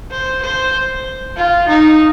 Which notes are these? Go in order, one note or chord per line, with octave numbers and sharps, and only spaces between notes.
C5
C5
F4
D#4